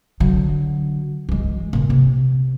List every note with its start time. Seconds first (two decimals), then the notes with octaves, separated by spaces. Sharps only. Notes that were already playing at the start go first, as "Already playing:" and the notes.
0.20 D3 F#3
1.29 E3 G#3
1.73 A#2 C#3
1.90 C3